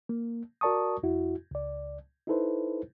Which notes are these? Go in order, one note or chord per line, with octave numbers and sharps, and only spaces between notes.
A#3
F#4 A#4 D5 A5 C#6 D#6
F2 E4 F#4
C#2 D5
D#4 E4 A4 B4 C5